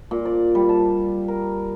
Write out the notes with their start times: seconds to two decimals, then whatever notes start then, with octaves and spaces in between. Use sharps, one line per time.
0.11 A#2
0.25 D5
0.55 G3
0.69 A5
1.28 A#4